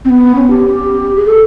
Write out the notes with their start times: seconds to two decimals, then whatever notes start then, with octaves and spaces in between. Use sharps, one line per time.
0.05 C4
0.10 B3
0.36 C#4
0.50 G4
0.66 G4
1.16 G#4
1.26 A4